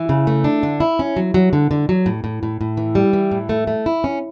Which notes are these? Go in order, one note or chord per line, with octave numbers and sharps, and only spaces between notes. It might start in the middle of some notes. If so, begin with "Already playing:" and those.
Already playing: E3
C#3
A3
D4
D3
E4
C#4
F#3
F#3
D3
D3
F#3
A2
A2
A2
A2
E3
G3
E3
A2
A3
A3
E4
C#4